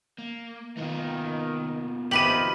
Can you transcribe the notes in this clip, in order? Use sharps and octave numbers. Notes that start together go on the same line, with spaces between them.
A#3
D#3 A#3 B3 F4
F2 C3 D#3 G4 B4 D#7 F#7